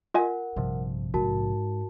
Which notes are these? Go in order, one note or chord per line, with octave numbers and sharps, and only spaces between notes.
F4 A#4 D#5 F#5 G#5
A#1 G2 C3 F3
G#2 F#4 A#4 A5